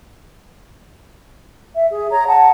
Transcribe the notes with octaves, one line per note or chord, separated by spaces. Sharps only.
E5
G#4
C#5 A#5
F#5 A5